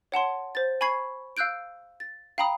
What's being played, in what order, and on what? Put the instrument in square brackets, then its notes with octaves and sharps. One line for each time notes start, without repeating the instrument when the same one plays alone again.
[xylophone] C#5 F#5 A5 C6
C5 A6
G#5 B5 C#6 G#6 C7
F5 E6 F#6 G6 D7
A6
F5 G5 A#5 B5 D#6